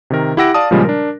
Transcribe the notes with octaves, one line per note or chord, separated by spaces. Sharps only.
C3 D#3 A#4
E4 G4 F#5 E6 A#6 D7
D5 F5 A5 D#6
A#2 C#3 F3 G3 G#3
D4 A#4